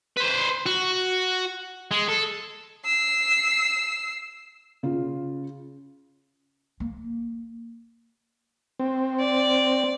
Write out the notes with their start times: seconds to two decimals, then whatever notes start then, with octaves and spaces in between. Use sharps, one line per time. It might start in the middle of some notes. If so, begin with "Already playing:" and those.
0.17 B4 C5
0.66 F#4
1.91 G#3
2.09 A4
2.85 E6 C7
4.83 C#3 F4
6.80 A#3
8.80 C4
9.20 D5